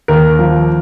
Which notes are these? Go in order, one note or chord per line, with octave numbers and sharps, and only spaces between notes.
D#2 A#4
F3